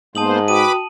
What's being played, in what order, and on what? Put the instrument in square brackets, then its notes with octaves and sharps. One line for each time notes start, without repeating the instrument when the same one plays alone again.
[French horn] G#2 [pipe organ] A#3 B3 C5 [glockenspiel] A5 D#6 F#7
[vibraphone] F#4 G5 D#6 [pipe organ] B4 B5 D6 [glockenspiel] D#7